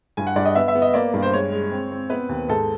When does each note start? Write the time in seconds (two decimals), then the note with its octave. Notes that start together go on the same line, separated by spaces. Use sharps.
0.17 G2 G#5
0.27 F#5
0.36 G2 D5
0.45 D#5
0.55 B3 E5
0.68 E5
0.75 B3
0.82 D#5
0.94 A#3 D5
1.14 G2
1.23 C5
1.32 G#3 C#5
1.52 G#3
1.72 C4
1.91 C4
2.10 B3 B4
2.29 D#2
2.48 G#2 A4